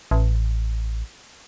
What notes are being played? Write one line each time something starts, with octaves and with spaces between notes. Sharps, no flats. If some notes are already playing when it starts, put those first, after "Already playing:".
A1